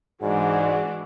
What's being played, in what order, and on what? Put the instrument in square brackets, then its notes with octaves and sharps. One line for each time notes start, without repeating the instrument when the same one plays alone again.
[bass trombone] G#2 [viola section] E3 G#3 D4 [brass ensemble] F#4 G#4 [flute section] D5